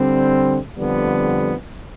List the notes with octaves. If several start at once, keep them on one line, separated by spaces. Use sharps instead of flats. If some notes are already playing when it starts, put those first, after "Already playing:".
Already playing: D3 G3 C4
F2 D3 G3 B3